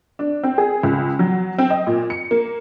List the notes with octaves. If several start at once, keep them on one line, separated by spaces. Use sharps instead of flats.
D4
C4
G#4
C#2
F#3
C4
D#5
A#2
C#7
A#3